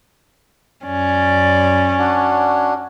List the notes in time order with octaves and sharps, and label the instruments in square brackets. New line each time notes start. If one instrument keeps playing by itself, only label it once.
[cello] F#2 D5 [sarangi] C#4
[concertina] D4 F#4